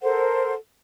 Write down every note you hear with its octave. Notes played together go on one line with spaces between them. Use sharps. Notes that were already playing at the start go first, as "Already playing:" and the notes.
A4 A#4 C5 F#5